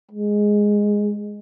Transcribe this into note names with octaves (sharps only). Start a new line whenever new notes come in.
G#3